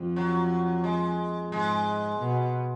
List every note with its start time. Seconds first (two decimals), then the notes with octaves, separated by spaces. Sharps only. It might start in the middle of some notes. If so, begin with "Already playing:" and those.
Already playing: F2
0.16 F#3
0.84 G#3
1.52 G#2 G#3
2.19 B2